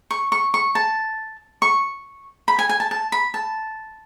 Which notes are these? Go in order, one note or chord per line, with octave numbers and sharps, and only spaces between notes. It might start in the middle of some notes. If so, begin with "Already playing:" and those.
C#6
C#6
C#6
A5
C#6
B5
G#5
G#5
A5
A5
B5
A5